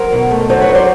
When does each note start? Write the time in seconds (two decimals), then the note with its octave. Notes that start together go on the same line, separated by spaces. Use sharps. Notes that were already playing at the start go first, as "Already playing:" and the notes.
Already playing: F#3 A#4 C5
0.12 B2
0.31 A3
0.49 F#3 C5 D5
0.61 B4 C#5
0.69 F#3
0.75 C5 D5